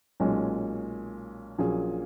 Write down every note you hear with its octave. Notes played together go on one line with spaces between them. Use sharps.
B1 A#2 G#3 C#4
A#1 A#2 F#3 C#4 G#4